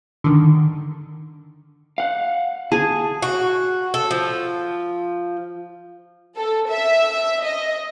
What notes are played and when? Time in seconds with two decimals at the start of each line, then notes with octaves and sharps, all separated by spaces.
0.24 D3 D#3
1.98 F5 F#5
2.72 G#4 A5
3.22 F#4
3.94 A4
4.11 F3
6.37 A4
6.70 E5
7.45 D#5